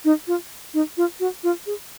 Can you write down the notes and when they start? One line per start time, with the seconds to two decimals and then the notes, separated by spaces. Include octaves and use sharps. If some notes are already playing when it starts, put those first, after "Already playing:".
0.05 D#4
0.27 F4
0.74 D#4
0.97 F4
1.20 F#4
1.44 F4
1.66 G#4